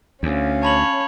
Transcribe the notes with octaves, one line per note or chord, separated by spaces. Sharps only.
D2 C#4 F5
C#5 A5 B5 F#7